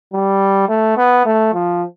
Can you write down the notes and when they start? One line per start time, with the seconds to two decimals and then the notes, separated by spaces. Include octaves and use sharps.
0.13 G3
0.69 A3
0.97 B3
1.25 A3
1.53 F3